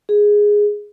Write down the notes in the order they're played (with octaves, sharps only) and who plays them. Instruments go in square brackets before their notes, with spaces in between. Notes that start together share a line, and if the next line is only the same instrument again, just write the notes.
[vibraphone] G#4